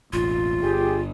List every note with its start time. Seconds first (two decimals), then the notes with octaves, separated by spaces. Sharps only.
0.13 E1 A1 F4
0.63 G1 G4 G#4